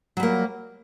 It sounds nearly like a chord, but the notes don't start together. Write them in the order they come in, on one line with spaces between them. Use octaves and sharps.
F#3 G3 A#3